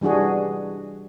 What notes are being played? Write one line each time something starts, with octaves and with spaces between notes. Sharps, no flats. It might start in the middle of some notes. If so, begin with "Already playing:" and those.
E3 G3 D4 F#4 G#4